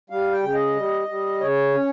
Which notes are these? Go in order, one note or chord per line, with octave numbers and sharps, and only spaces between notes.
G3 F5
G5
C#3
D#5
G3
G3
C#3 C#5
C#4